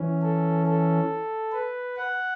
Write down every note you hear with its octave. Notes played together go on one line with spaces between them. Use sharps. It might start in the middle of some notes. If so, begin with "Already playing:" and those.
Already playing: E3 C#4
A4
A4
B4
F#5